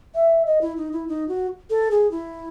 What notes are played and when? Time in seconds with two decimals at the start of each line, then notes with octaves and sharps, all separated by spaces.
0.15 E5
0.46 D#5
0.61 E4
0.77 D#4
0.93 E4
1.08 D#4
1.29 F#4
1.70 A4
1.91 G#4
2.11 E4